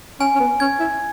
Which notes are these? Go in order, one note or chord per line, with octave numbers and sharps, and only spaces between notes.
C#4 G#5
C#4
B3
C#4 G#6
E4